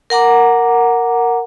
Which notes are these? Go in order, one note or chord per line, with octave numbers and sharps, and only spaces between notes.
A#4 F#5 A#5 D6